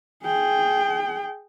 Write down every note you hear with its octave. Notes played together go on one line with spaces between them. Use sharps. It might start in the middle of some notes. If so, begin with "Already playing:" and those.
G#4 G5